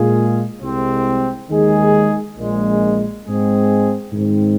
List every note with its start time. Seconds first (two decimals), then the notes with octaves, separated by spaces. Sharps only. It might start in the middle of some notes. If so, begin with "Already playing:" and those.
Already playing: A#2 G#3 F4 G#4
0.61 C2 C3 G#3 C4
1.49 D#2 D#3 G#3 D#4 G#4
2.37 A#1 A#2 G#3
3.25 G#2 G#3 C4 G#4
4.12 G#2 D#3 C4